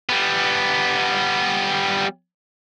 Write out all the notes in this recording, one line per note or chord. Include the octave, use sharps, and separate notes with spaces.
G3 B3